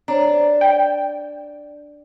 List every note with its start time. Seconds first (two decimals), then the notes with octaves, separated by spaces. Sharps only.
0.08 D4 C5 C#5 A#5
0.61 G5